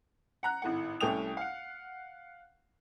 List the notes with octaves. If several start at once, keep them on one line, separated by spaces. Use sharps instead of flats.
F#5 A#5 F#6
G#1 A2 F#5
C2 A3 C#4 G5 D#6 F7
F5 F#5